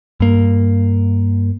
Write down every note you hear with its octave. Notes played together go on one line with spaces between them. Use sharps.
G2 A#3